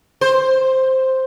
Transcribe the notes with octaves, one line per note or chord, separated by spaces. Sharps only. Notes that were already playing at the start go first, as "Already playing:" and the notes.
C5